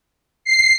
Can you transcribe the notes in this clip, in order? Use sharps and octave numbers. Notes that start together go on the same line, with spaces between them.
C7